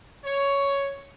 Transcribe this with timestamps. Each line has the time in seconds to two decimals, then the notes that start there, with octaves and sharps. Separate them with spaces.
0.24 C#5